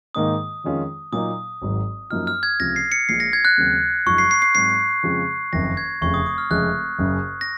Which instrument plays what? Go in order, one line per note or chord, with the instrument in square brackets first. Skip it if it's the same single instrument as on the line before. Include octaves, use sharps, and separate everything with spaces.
[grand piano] G#2 D#3 A#3 D#4 [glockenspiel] D#6
[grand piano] F2 D#3 G#3 C#4 F4
[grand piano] A#2 F#3 A#3 D#4 [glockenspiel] D#6
[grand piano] G#1 G#2 F#3
[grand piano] F#2 F3 A#3 D#4 F#4 [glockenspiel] F6
[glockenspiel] F6
G#6
[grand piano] C#2 C3 F3 [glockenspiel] A#6
[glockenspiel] C7
C#7
[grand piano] A#1 A#2 F3 G#3 [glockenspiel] C7
[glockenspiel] A#6
G#6
F#6
[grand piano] D#2 C#3 F#3 C4
[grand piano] F#1 F#2 F3 G#3 D#4 [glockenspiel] C#6
[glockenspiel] C7
C7
C7
[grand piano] G#2 F#3 C4 [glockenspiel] C7
[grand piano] F2 C#3 F3 G#3 C4
[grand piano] F#1 F2 D#3 [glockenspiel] A#6
[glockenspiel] G#6
[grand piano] F1 F2 C#3 [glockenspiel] C#6
[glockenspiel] D#6
D#6
F6
[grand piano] F1 F2 C#3 G#3 [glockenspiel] F#6
[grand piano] F#1 F#2 C#3
[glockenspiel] A#6